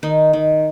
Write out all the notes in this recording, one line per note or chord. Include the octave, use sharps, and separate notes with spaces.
D#3 D#4
D#3